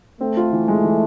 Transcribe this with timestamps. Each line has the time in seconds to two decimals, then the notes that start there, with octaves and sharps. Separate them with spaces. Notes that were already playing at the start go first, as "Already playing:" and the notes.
0.21 A3 C4
0.37 F4
0.52 E3
0.68 G#3
0.84 E3